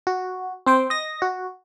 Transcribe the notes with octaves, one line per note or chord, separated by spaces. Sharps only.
F#4
C4 C5 G5
D#5 A#6
F#4